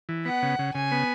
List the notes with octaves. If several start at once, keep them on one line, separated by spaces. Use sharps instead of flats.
E3
B3 F#5
C#3
C#3
C#3 G#5
B3